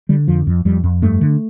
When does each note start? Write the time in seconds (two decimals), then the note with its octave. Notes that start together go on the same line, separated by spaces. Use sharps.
0.09 D3 G3
0.28 F2 F3
0.47 F2
0.65 F2 G3
0.84 F2
1.02 G2 A3
1.21 D3